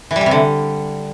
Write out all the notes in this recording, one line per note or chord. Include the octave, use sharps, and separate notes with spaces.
E3
G3
E3
C3
D3